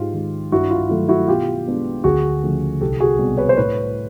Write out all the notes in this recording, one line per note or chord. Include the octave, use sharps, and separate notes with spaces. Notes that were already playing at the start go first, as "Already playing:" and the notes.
Already playing: G#2 F4 G4
D#3 G#3
G2 E4 F#4
F4
D#3 F#3 A3 F4
E4 F#4
B2 F4 G4
G#3 B3 D4
D2 F#4 G#4
C#3 F3 A3
C2 G4 A4
F#4 G#4
B2 G3 C4
B4 C#5
C5
A2 B4 C#5